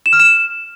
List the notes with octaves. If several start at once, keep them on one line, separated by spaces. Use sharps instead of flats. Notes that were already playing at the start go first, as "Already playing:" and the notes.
E7
F6
E7